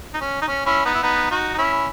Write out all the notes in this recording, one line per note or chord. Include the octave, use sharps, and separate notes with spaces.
D#4
C#4
D#4
C#4
C#4 E4
B3 D#4
E4
B3 D#4
D#4 F#4
D#4
C#4 E4